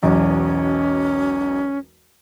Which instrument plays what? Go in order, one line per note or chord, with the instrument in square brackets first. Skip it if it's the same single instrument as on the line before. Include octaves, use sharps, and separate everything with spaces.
[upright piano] E1 B1 E2 [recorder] C#4